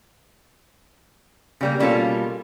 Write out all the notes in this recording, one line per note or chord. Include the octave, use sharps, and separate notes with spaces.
C#3 G3 A#3
B2 G3 A#3 C#4 F4 A4